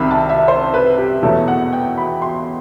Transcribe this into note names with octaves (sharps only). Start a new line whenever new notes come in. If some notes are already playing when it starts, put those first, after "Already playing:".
Already playing: C2 C3 D#3 G5 B5
A5
E5
C5
B4
G4
E2 B2 F#3 A3 A4
F#5
G5
B5
C6